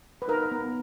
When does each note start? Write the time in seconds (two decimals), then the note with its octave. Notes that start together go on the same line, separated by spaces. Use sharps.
0.22 B4
0.28 D#4 A#4
0.51 B3